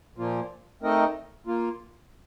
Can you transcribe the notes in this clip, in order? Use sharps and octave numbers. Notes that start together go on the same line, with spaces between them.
A#2 F3 A#3 F4
A3 C4 D#4 A#4 D#5
A#3 F4